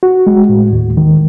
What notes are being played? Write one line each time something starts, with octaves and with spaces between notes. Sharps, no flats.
F#4
G#3
A2
D#2
D#3